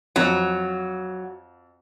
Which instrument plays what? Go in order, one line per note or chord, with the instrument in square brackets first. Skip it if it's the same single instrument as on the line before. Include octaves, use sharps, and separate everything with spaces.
[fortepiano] F2 [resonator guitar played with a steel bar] F#3